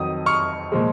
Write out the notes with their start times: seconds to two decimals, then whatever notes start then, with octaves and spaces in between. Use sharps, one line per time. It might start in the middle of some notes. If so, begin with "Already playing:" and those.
Already playing: F2 D#3 F#3 D#6
0.26 C#6 F6
0.72 A#2 F3 G#3